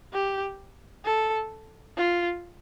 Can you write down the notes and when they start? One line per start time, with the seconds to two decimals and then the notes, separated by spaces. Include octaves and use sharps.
0.13 G4
1.05 A4
1.97 F4